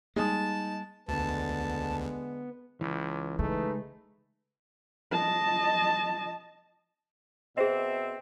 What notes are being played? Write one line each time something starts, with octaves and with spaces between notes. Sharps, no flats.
G3 G#3 A#3 D#4 A5 D#6
D2 D3 G#3 B3 A5
C#2 E3
C#3 G#3 A3 D#4 G#4 B4
D#5 A5
B2 C4 G#4 C5 D#5 E5